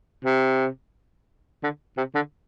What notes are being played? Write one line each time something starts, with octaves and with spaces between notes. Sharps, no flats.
C3
D3
C3
D3